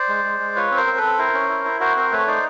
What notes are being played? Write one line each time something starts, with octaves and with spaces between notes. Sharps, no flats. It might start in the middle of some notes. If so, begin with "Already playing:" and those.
Already playing: C5 D5
G#3
G#3
G#3
F4 B4 C#5
C4
A#4 C5
C4
A4 B4
C4
E4 A#4 C5
C#4
E4
E4
F#4 A#4 C5
C4 A#4 C5
A3 B4 C#5
D#4 C5 D5